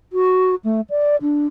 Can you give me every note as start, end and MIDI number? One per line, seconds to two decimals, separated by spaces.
0.13 0.55 66
0.65 0.81 57
0.90 1.16 74
1.22 1.46 62